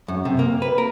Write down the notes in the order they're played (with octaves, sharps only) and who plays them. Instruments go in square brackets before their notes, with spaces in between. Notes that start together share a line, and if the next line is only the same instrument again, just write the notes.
[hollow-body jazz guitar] F#2
C3
A#3
B4
A#4